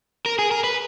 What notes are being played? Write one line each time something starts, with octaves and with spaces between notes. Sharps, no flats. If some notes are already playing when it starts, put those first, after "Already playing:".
A#4
G#4
A#4
B4